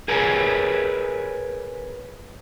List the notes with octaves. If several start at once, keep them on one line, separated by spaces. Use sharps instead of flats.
G#4 A#4 B4 C#5 G#5